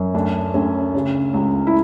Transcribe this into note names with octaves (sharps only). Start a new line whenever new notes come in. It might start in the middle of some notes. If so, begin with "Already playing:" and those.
Already playing: F#2
D2 D4
D2 C#4
C#3
C#2
E4